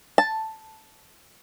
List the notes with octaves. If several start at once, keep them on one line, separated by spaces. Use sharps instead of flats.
A5